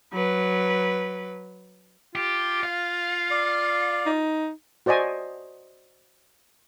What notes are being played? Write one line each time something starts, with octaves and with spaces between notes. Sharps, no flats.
F#3 B4
F4 G4
F5
D5
D#4
F#4 C5 D5 D#5 G#5